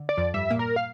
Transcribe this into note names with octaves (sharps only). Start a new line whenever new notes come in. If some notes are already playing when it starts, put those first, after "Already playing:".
Already playing: D3
D5
F2 F3
G2 G3 E5
A#2 A#3
A#4
F5